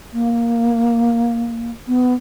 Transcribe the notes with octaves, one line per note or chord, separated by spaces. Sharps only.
A#3
B3